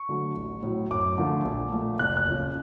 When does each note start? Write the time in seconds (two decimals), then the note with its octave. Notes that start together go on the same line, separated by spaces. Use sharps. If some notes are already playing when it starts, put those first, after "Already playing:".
Already playing: C#6
0.09 D3 F#3 A3
0.37 A1
0.63 A2 F#3
0.91 F#2 D6
1.18 D3 F3 A3
1.45 A#1
1.72 A#2 F3 A3
1.99 F#1 F#6
2.17 F#6
2.28 F2 C#3 F3